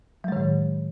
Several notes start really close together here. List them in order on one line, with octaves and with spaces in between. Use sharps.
F#3 G#3 D#3 A2